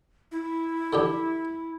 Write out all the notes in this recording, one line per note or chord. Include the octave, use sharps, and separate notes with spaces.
E4
D3 E3 G4